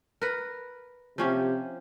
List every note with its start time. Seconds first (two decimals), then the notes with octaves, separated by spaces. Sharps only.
0.22 A#4 B4
1.18 C3 F3 C#4 G4